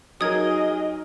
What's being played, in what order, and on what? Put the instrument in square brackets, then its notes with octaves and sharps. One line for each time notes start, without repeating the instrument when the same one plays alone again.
[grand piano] F#3 D#4 A#4 [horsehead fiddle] G#4 D#5 [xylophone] D#6 G#6